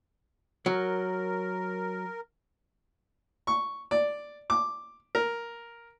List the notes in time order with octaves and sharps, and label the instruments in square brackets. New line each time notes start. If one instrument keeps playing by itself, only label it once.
[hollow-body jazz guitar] F#3 [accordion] A#4
[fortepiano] C#6
D5
D6
A#4